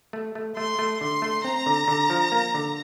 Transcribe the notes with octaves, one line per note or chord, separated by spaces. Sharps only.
A3
A3
A3 C6
A3
D3 C6
A3
C4 A#5
D3
D3
F3
A#3
D3